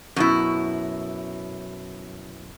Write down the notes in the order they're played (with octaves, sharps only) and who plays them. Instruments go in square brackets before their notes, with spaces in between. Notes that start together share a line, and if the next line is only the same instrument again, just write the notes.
[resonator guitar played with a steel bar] F#2 B2 E4